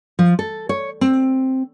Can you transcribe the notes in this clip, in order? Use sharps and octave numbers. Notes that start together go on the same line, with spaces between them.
F3
A4
C#5
C4